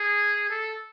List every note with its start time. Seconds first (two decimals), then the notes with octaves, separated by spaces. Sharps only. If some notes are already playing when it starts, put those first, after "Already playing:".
Already playing: G#4
0.50 A4